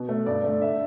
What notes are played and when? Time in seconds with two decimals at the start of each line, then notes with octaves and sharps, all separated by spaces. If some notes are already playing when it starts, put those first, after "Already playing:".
Already playing: B2
0.09 A3
0.26 G2 D5
0.44 D3 A3
0.62 E5